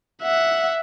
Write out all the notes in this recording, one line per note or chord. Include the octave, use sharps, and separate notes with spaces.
E5 F#5